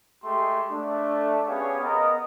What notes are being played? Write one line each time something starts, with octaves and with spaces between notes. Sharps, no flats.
G#3 A3 G4 C6
A3 D4
B3 C#4 G4 G#4 C#5 F5
B3 A#4 D#5